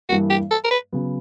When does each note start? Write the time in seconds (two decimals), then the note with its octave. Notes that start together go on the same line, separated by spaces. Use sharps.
0.09 G2 E3 G3 A#3 F#4
0.30 G4
0.51 A4
0.64 A#4
0.71 B4
0.92 C#3 F#3 B3